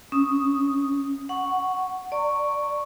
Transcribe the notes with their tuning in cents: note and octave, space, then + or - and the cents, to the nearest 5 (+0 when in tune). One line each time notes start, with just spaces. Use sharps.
C#4 +0 D#6 +0
F#5 +0 C#6 +0
D5 +0 A#5 -35 C#6 +0